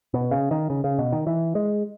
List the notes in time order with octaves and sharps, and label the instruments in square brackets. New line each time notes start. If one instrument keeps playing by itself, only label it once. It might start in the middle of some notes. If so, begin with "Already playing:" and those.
[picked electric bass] B2
C#3
D#3
C#3
C#3
B2
D#3
E3
G#3